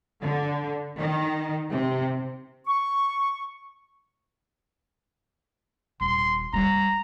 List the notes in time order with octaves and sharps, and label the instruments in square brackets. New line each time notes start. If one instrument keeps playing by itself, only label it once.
[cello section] D3
D#3
C3
[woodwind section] C#6
[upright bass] D#1 [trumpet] C6
[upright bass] G3 G#3 [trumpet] A#5